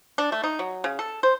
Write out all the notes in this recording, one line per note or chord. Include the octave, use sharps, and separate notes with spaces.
D4
A3
D#4
F#3
C#3
A4
C5